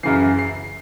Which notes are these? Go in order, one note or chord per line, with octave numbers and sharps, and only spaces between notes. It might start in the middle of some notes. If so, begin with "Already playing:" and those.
F#2 C#3 E3 C7
C7